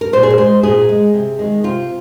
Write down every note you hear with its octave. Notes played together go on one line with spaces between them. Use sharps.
A#4
A#2 C5
G#4
A#4
G#3 C5
A#2 G#4
G#3
C3
D#3 G#3
C3 F4